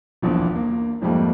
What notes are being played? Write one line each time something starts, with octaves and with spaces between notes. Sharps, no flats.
D#1 A#1 E2 D4
A#3
F2 G#2 F3 G3 A3 A#3